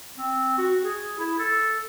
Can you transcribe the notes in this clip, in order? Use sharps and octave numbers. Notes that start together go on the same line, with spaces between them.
C4
F#4
G#4
E4
A4